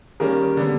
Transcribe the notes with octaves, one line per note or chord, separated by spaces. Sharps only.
D#3 G3 A#3 C#4 G#4 A#4
D3 G3 B3